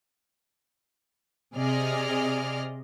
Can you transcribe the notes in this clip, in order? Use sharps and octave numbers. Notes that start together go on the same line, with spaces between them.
C3 G#4 D5 D#5 F6